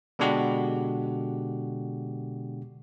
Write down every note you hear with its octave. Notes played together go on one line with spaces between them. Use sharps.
B2 D3 G#3 D4 F#4 G4